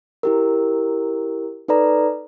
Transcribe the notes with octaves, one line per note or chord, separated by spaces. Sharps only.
E4 G4 A#4
D#4 A4 B4 D5 A#5